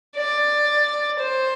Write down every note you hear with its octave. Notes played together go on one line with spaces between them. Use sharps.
D5
C5